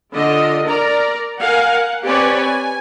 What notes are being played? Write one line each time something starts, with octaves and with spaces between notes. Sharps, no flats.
D3 F4 D#5
A#4 D5 A#5
A#4 F5 F#5 G#5
F#5
C4 G4 B4 C#5 D5 G#5
G#5